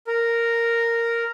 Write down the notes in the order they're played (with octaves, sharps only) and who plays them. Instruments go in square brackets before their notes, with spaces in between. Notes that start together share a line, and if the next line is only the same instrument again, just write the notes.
[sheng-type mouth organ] A#4